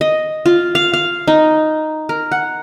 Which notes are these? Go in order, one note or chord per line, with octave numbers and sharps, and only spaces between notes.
D#5
F4
F5
F5
D#4
A#4
F#5